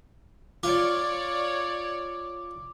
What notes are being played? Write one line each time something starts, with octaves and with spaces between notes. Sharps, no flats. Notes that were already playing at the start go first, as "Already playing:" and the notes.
F4 C#5 D5 D6